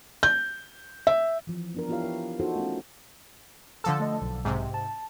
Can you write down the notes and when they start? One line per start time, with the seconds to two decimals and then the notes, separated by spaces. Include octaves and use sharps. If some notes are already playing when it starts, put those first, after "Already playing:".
0.23 G6
1.07 E5
1.47 E3 F3
1.74 B3 D4 A#4
1.89 B3 E4 F4 G4 C#5 F5
2.03 A#4
2.40 D#4 F4 F#4 A4 C5
2.56 A3 C#4
3.84 D3 F3 A4
4.00 A3 D#5
4.21 B1
4.45 G#2 C3
4.74 A5